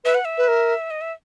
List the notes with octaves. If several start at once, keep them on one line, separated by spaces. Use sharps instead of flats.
B4 E5
F#5
E5
B4
A#4
D#5
E5